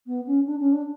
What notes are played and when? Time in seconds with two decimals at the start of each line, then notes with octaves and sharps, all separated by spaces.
0.06 B3
0.26 C#4
0.46 D4
0.59 C#4
0.72 D4